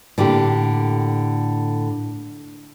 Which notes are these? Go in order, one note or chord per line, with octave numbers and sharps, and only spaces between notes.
A2 D3 A#3 G4